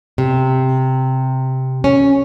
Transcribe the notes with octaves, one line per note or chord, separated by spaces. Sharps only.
C3
C#4